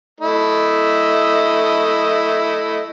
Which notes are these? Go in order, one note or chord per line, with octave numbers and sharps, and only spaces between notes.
A3 E4 D#5